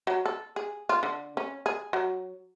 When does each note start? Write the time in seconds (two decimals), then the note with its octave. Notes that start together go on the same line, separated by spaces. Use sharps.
0.07 F#3
0.26 A4
0.56 G#4
0.89 F4
1.03 D3
1.37 C#4
1.66 G#4
1.93 F#3